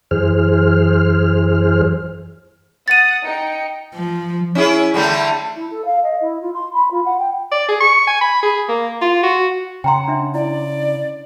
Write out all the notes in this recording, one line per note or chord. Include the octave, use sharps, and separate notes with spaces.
F#2 E3 G#4 C5 F6
F#5 D#6 A6 D#7
D#4 G5 C#7
F3
C#4 E4 G#4
D3 G3 A3
E4
A4
F5
D#5
E4
F4
C6
B5
F4
F#5
G5
D5
G#4
C#6
G#5
B5
G#4
A#3
F4
F#4
C#3 F#5 G5 A#5 C6
D4 E5
E4 D5